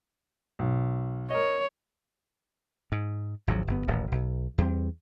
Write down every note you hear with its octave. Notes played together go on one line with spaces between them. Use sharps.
B1
A#4 C#5 D#5
G#2
G#1 D2 F3 F#3
G1 F#2 B3
D#1 A1 A2
B1
E2 G3 C4